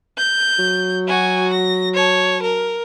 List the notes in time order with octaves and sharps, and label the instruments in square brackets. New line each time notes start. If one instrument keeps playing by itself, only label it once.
[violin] G6
[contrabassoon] F#3
[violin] F#4 G#5
A#6
C#5 A5
A#4